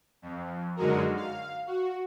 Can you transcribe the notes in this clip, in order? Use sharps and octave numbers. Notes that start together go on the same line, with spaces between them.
F2
F#2 D3 G#3 D#4 F#4 A#4
F5
F#4